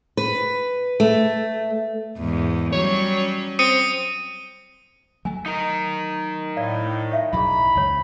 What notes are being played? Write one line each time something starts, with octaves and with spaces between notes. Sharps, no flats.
B4
A3
E2 G#2
F#3 G3 C#4 C#5
C4 D#6 C#7 D#7
F#3 A3 G#5
D#4 A#4
A2 D5 F5
C#5 E5 F5
B1 F#2 F#3 E4 G#4 B5
C#2 F#2 D#4 C#5